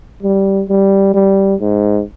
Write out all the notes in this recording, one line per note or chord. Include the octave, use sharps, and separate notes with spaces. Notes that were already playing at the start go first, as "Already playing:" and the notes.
G3
G3
G3
G#2